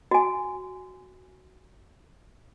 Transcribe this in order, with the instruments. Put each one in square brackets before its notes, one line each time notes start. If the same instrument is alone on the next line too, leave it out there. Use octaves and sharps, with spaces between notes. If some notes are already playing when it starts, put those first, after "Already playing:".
[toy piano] F#4 G#5